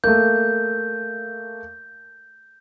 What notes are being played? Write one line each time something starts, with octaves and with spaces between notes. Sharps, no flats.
A3 A#3 G6